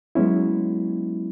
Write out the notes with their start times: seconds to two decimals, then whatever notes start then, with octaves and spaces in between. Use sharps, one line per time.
0.15 F#3 G#3 B3 C#4 E4